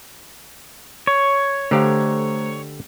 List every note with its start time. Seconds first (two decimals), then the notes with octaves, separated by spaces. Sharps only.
1.07 C#5
1.71 D3 A3 G4 C5 F5 A#5